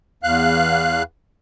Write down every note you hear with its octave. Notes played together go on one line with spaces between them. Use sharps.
E2 F5 F#6